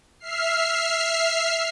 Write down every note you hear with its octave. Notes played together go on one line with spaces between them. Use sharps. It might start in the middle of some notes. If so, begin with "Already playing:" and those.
E5 F6 C7